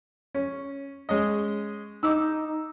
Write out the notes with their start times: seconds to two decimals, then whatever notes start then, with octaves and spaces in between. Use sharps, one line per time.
0.35 C#4
1.09 G#3 C#4 D#5
2.03 D#4 D6 E6